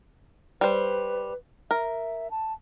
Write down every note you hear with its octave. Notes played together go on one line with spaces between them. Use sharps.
G3 B4 C5
A#4 E5
A5